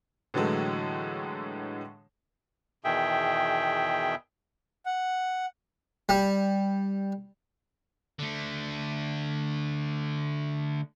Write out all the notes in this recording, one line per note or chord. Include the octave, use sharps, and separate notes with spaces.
A2 D3 E3 F#3 G#3 A3
E2 B2 D#3 G#4 E5 G5
F#5
G3
D3 A3